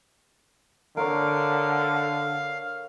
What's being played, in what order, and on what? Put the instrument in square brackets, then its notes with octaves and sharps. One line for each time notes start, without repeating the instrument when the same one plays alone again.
[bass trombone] D3 [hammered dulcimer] A#4 C#5 [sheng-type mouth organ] F5